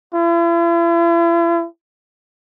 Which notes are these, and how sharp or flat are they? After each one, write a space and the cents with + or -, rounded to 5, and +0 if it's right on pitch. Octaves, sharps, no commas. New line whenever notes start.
E4 +45